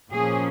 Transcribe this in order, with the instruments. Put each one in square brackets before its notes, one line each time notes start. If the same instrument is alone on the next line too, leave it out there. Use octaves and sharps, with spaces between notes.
[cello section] A#2 F3 A#3 C#4 G#4